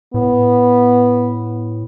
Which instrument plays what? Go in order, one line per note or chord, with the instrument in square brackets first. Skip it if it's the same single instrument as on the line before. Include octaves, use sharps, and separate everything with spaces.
[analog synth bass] A2 [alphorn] B3